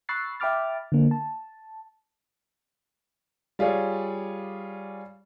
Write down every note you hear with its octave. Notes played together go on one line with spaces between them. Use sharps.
B5 C#6 E6 F#6 A6 C7
E5 G5 B5 D6 F6 A6
D3 A#3
A5
G3 F4 G#4 C#5 D5